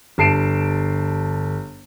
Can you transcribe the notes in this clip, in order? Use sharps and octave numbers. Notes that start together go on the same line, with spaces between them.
G1 A5 C7 D7 E7